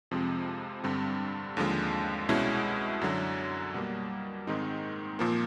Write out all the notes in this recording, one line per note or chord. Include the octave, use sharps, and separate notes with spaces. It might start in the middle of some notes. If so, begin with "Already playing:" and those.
F2 C3 F3 G#3 C4
G2 D3 G3 C4
D#2 D3 F3 G#3
C2 B2 G#3 C#4 E4
F#2 D3 F#3
B2 G3 A#3
G#2 D#3 G#3 C4 D#4
A#2 F3 A#3